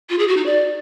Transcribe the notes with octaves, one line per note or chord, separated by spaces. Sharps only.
F4
G#4
F#4
D#4
D5